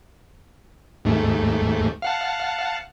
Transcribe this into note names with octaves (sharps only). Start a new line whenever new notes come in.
D#2 G#2 A3
F5 F#5 A5